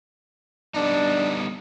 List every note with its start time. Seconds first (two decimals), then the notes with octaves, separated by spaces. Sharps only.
0.74 G3 B3 D4 D#4